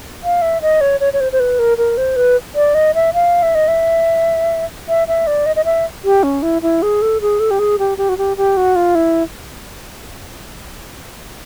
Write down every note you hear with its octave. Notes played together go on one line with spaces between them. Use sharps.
F5
E5
D#5
C#5
C#5
C#5
C5
C5
B4
A#4
A#4
C5
B4
D5
D#5
E5
F5
E5
D#5
E5
E5
E5
D5
D#5
D#5
E5
G4
C#4
E4
E4
G#4
A4
G#4
A4
G4
G#4
G4
G4
F#4
G4
G4
F#4
F4
E4